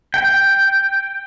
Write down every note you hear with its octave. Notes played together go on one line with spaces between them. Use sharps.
G5